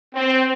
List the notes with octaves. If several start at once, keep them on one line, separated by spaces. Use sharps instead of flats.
C4